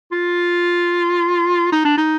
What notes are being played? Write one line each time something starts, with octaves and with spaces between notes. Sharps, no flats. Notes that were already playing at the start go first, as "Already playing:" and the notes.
F4
D#4
D4
D#4